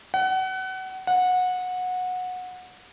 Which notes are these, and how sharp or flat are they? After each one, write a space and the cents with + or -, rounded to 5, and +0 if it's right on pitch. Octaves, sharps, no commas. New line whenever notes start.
F#5 +30
F#5 -20